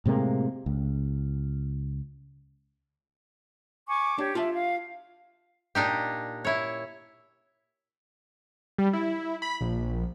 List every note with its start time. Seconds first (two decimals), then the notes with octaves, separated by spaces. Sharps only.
0.06 A2 C3 G#3 A#3
0.66 C#2
3.86 G#5 C#6 D6
4.18 D4 G4 C#5
4.35 F4 E5 A5
4.55 F5
5.75 A#2 D4 D#4 G4
6.45 E4 C#5
8.78 G3
8.93 E4
9.42 B5
9.61 A#1